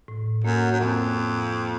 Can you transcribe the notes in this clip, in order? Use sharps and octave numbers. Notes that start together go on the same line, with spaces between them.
A2
F#2 A#3
F#2
F2 A2
A2
A#3